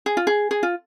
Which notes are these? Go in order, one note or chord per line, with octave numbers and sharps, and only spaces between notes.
G#4
F4
G#4
G#4
F4